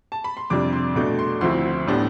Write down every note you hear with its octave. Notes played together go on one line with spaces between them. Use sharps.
A5
B5
C6
F2 C3 G3 D4 D6
C6
B2 A3 D4 D6
C6
D2 D3 F3 C4 E4 C6
A2 G3 B3 D4